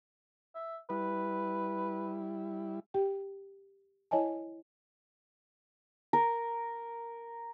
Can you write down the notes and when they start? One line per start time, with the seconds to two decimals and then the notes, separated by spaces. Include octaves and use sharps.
0.55 E5
0.90 G3 E4 B4
2.94 G4 G5
4.11 E4 C#5 D#5 G#5 A5
6.13 A#4